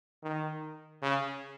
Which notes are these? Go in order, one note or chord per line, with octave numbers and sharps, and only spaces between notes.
D#3
C#3